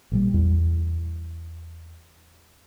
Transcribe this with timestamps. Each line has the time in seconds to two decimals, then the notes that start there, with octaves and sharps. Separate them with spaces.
0.12 A1 A#2 G3
0.34 E2